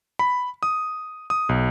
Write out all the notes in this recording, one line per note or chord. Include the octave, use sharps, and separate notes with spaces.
B5
D#6
D#6
B1